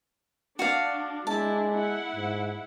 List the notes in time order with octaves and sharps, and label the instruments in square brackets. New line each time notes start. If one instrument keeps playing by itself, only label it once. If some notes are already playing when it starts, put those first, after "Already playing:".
[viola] D4 [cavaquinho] F#4 D5 F5
[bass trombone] G#3 [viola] D4 E4 [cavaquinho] A5
[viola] E4 F#5
[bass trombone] G#2